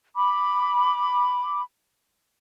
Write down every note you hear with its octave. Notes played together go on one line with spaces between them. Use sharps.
B5 D6